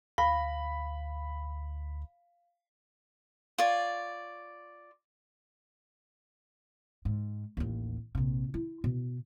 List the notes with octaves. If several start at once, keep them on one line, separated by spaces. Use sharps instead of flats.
D2 F5 B5
F4 C#5 D5
G#2
A1 D#2
A#1 C3
E4
B2